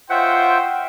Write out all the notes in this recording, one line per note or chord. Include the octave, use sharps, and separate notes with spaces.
F4 C5 C#5 D#5 E5 F#5 G5 C6